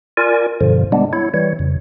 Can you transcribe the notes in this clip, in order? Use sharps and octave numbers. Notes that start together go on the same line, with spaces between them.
F4 A#4 D5 G#5
G2 B2 D3 F3
G3 G#3 B3 D4
E4 C#5
E3 G3 C#5
F2 C#3